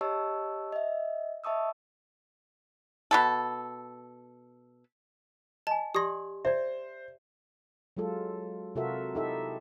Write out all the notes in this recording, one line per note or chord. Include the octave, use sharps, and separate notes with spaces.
G4 C#5 D#5 A5 C#6 E6
D#5 E5
D#5 E5 A5 C#6 D#6 E6
B2 G3 A4
D#5 G#5 A5
G4 D5 C6 D#6 A#6
C5 D5 E5
F#3 G#3 F4 A4
C3 F4 F#4 A4 A#4 E5
D#4 E4 G4 A4 E5